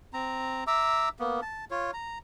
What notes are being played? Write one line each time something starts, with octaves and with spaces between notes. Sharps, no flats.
C4 A#5
E5 A#5 D6 E6
A#3 B3
A5
F4 C#5
A#5